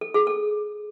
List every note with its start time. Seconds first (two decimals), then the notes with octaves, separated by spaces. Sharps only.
0.01 A4
0.14 G#4
0.27 A4